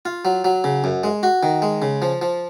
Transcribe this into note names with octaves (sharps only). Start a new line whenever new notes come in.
F4
F#3
F#3
C#3
F#2
G#3
F#4
D#3
G#3
C#3
F3
F3